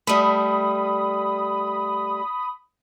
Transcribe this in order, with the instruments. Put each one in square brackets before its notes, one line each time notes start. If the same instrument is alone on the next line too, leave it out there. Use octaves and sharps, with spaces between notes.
[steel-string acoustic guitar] G3 A3 [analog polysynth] B5 D#6